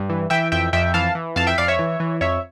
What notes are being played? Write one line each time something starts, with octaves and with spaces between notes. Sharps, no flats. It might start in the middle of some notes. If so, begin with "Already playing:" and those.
Already playing: G2
E3
E3 E5 G5
F2 E5 G5
F2 E5 G5
E3 F5 A5
E3
F2 F5 A5
E5 G5
F2 D5 F5
C#5 E5
E3
E3
F2 C#5 E5